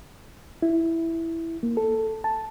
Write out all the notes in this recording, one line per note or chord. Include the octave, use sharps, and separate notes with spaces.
E4
A#3
A4
A5